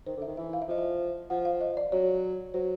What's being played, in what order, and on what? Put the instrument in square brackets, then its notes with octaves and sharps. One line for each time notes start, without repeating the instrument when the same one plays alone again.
[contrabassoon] D#3 [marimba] C5
[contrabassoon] D3
[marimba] E5
[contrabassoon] D#3
[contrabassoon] E3 [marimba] E5
[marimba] F5
E5
[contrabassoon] F3 [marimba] D#5
[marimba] E5
[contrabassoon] F3 [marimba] F#5
[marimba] F5
D#5
D5
[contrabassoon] F#3 [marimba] C#5
[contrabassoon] F#3 [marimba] C5